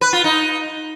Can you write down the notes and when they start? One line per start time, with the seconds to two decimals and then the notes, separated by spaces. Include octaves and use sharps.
0.01 B4
0.13 F4
0.24 D#4